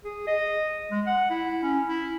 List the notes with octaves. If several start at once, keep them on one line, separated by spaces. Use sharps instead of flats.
G#4
D#5
G#3
F#5
E4
C#4
E4